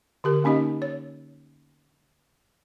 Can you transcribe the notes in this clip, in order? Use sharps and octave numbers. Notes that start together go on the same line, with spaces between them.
D3 G4 A#4
A#3 C#4 D#4 G4 D#5
C#5